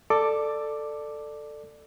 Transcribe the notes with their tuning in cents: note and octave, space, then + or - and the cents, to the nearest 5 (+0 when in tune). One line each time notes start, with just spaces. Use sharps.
A4 +10 D5 +15 D6 +0